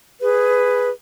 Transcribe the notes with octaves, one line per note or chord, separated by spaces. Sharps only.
G#4 B4